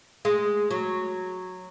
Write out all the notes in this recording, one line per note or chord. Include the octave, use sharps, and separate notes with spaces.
G#3
F#3